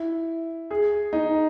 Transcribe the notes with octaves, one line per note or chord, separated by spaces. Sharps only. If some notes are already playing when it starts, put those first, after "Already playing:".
Already playing: E4
G#4
D#4